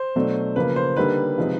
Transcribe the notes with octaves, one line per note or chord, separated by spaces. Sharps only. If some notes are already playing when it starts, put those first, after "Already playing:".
Already playing: C5
B2 F#3 A3 D4
C#3 F3 A#3 B4
C5
D3 G3 A#3 D#4 B4
C3 F3 G#3 C4 D#4